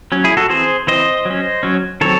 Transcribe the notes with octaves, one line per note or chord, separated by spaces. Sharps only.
F#3 C#4
E4 G#4
F#4 A4
E3 C4 G#4 C5
E3 C4 C5 D#5
F#3 C#4
F#3 C#4
D#3 F#3 C4 A4 C#5